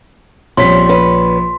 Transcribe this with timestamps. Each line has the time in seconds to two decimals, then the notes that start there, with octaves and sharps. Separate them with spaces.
0.57 A#1 G3 C4 C#4 C6 B6
0.89 C#4 B4